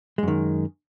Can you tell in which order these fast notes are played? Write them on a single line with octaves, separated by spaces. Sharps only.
G#3 F#2 D#3